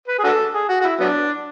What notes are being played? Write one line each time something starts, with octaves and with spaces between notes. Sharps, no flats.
B4
G#4
D4 F#4 A4
G#4
F#4
F#4
E4
F#3 B3 D4